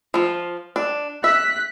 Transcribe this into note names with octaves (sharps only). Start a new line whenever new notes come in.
F3 F4
D4
E5 F#6 B6